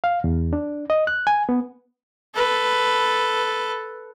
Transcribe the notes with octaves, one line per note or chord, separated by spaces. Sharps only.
F5
E2
D4
D#5
F#6
G#5
B3
A4 B4